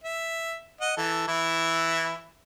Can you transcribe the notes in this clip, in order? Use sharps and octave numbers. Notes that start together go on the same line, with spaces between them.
E5
D#5 F#5
E3 A4
E3 E4